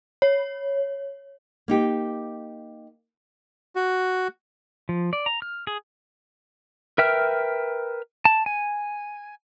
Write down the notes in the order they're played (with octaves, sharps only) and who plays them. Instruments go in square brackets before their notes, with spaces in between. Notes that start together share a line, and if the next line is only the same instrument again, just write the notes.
[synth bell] C#5
[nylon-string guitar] A#3 D#4 G4
[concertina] F#4
[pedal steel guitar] F3
D5
A#5
F6
G#4
A#4 B4 E5 G5 F6
A5
G#5